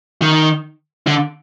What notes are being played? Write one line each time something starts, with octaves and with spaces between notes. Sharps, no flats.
D#3
D3